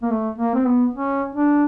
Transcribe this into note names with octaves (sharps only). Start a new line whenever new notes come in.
A#3
A3
A#3
C4
B3
C#4
D4